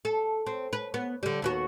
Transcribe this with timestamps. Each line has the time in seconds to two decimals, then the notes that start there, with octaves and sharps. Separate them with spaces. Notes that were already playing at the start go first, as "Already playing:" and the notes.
0.05 A4
0.46 C4
0.73 B4
0.94 B3
1.23 D3 G3
1.42 D#2 B3 F#4